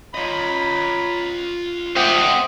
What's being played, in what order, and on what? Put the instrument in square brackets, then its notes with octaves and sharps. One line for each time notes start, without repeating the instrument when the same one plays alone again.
[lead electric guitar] F4 D#5 [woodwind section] C#5 A#5 B5
[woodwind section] G#3 D6 D#6 [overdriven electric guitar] C4 [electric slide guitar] C5 E5 F#5